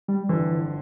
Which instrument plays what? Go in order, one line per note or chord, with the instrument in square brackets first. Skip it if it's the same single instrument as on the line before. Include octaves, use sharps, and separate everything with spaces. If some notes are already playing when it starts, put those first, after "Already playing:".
[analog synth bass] G3
[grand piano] G1 F2 D3 [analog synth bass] E3